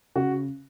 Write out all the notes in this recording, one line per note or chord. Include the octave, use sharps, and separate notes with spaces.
C#3 F#4